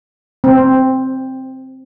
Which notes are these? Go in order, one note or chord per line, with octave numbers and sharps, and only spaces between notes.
C4